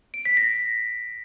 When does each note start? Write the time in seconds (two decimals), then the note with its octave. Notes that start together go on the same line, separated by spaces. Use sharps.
0.14 D7
0.25 B6
0.37 A#6